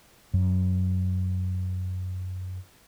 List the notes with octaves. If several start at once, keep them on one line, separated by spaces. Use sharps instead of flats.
F#2 F#3